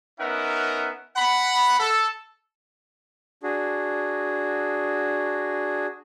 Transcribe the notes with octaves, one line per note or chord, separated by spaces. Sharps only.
B3 C#4 D#4 A#4 E5 F#5
F#5 B5
A4
D4 F#4 G#4